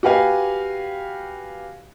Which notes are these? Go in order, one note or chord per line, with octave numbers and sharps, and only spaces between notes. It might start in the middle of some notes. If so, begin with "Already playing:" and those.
F#4 G4 B4 F5 G#5